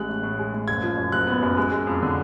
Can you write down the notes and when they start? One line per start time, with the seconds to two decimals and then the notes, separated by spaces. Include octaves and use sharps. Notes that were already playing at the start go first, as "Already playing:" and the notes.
Already playing: A1 G#3 F#6
0.09 A2
0.23 A2
0.39 G#3
0.54 A2
0.68 F#1 G#6
0.83 F3
0.97 F#2
1.12 F#1 F#6
1.27 B3
1.43 F#2
1.57 G#3
1.72 G#3
1.87 F2
2.02 D3